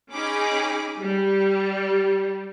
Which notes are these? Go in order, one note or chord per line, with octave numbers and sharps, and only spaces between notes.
C#4 D#4 G#4 B5 D6
G3